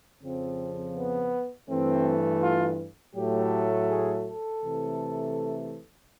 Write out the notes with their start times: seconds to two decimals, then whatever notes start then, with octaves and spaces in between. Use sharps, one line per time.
0.22 F2 C#3 F3 C4
0.96 B3
1.69 G2 E3 A3 C4
2.42 F4
3.16 A2 F#3 A3 G4
3.89 G#4
4.25 A4
4.62 C3 E3 A3